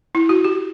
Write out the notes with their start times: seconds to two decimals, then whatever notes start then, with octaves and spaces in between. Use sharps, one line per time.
0.15 E4
0.29 F#4
0.44 G4